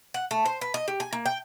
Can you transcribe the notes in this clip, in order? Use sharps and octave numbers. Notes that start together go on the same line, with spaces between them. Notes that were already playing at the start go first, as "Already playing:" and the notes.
F#5
A3
C5
B4
D#5
G4
G#5
A#3
G5